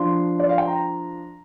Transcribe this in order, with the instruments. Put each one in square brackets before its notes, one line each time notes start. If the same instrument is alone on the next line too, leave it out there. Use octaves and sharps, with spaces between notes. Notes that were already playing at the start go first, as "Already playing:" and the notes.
Already playing: [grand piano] F3 D4 C6
D5
F5
G5
A#5